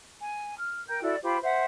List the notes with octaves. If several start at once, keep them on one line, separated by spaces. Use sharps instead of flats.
G#5
F6
A#4 G5 G6
E4 F#4 A4 D5
F4 G4 C5 B5
C5 E5 F#5